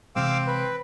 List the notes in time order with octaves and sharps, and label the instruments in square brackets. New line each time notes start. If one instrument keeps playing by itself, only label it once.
[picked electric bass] C3 E3 G#3 [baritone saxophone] C4 [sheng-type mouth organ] F5 D6 E6
[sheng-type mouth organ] B4